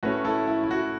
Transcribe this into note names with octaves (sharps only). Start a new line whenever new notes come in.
A2 A3 C#4 F#4 B4
E4 A4
E4
E4
F#4